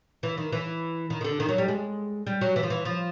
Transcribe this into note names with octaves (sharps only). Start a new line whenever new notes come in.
E3
D#3
E3
D#3
D#3
D3
D#3
F#3
G3
G#3
G3
F#3
E3
F3
E3
F3